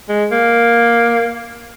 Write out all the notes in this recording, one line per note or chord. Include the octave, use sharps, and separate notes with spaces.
G#3
A#3